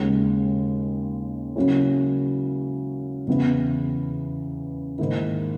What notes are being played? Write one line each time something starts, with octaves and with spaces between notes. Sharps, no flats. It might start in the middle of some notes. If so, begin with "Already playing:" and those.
Already playing: D#2 C#3 G#3
C#3 F#3 A#3 C#4 E4
E2 C#3 E3 B3 E4
G#2 D#3 A#3 E4